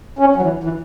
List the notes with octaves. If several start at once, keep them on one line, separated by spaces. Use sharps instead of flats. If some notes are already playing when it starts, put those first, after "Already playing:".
C#4
F#3
E3
E3